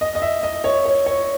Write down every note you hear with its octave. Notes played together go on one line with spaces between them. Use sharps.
D#5
D#5
E5
D#5
C#5
C#5
C#5